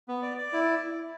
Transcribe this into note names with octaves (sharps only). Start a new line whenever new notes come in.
B3
D5
D5
E4